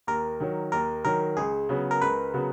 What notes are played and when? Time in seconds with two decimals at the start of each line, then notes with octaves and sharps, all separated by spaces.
0.07 D#2 A#4
0.40 D#3 F#3
0.72 D#2 A#4
1.05 D#3 F#3 A#4
1.37 C#2 G#4
1.69 C#3 F#3 B3 F#4
1.91 A#4
2.02 C#2 B4
2.34 C#3 F#3 B3 F#4